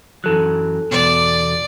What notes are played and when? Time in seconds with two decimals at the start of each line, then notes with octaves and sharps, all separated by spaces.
0.24 F#2 E3 F#3 A4 F#6
0.91 E2 B2 D5